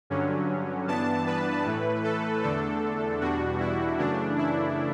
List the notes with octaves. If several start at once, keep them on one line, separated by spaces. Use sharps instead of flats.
G2 D3 F#3 C#4
G2 E3 B3 D4 A5
B4
A2 E3 A3
A4
E2 D3 A3 D4 A4
E2 B2 G3 D4 F#4
E4
F#2 C#3 E3 A3 D4
E4